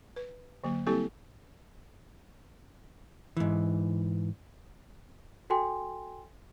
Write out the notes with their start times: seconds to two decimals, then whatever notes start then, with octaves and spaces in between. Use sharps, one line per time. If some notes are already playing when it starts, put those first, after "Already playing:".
0.16 B4
0.64 D3 F#3 A#3
0.87 G3 A#3 C4 E4 G4 A4
3.37 G#2 E3
5.50 F#4 A4 G5 G#5 C6